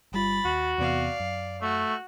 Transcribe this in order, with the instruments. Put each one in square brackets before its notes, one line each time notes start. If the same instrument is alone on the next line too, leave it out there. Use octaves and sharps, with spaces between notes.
[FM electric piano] G1 G3 F4 [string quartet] B5 A6
[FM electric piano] D#2 [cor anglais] F#4
[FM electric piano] E2 C3 B3 [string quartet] D5 F5
[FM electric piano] F#2
[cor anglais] A3 [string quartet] F#4